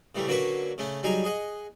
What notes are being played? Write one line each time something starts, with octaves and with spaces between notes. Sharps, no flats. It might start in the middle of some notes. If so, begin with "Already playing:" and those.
C#3 E3 G3 A3
D3 F#3 A#3 C#4 B4 C#5
C#3 A3 C#4
F#3 G3 D#4 G#4 G#5 A#5
G#4 D#5 F#5